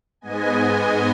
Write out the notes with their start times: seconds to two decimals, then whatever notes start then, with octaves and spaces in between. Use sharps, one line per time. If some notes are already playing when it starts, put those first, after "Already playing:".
0.21 G#2 G#3 B3 D#5 G#5